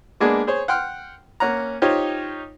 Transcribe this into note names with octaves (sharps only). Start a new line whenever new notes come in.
G#3 A#3 B3 D4 G#4
G#4 C5 C#5
F#5 G5 C6 F6
A#3 C#4 F#5 A#5
D#4 F4 G4 C5 C#5